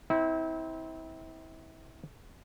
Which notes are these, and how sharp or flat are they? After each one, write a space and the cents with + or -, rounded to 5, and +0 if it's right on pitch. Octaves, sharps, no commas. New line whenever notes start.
C4 -10 E4 -35